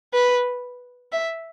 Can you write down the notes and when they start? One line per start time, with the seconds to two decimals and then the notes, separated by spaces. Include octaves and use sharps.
0.14 B4
1.12 E5